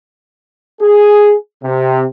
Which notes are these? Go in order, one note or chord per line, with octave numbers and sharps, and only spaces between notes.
G#4
C3